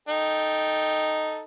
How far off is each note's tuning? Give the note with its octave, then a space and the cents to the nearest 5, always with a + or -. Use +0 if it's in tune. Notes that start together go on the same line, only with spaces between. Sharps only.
D#4 +0 A4 +0 G5 +0